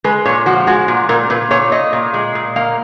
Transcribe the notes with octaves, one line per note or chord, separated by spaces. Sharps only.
G#3 B4
A#2 C#5
F3 F#4
G#3 F#4
A#2
A#2 A#4
A#2 B4
A#2 C#5
A#2 D#5
A#2
G#3
A#2
A#3 F5